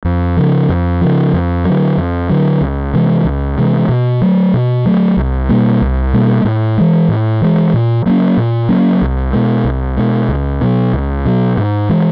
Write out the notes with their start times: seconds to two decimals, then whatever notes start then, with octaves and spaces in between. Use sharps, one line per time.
0.05 F2
0.37 C#3 F3
0.69 F2
1.01 C#3 F3
1.33 F2
1.65 F#3
1.70 D3
1.97 F2
2.29 D3 F#3
2.61 C#2
2.94 C3 E3 G#3
3.25 C#2
3.58 C3 E3 G#3
3.89 B2
4.22 F#3 A3
4.54 B2
4.86 F#3 A3
5.17 C2
5.49 B2 G3 A#3
5.81 C2
6.14 B2 G3 A#3
6.45 A2
6.78 E3 G#3
7.08 A2
7.42 E3 G#3
7.74 A#2
8.06 F#3 A#3 C#4
8.37 A#2
8.69 F#3 A#3 C#4
9.02 C2
9.33 B2 G#3
9.64 C2
9.97 B2 G#3
10.28 C#2
10.61 B2 F#3
10.93 C#2
11.25 B2 F#3
11.57 G#2
11.89 E3 G#3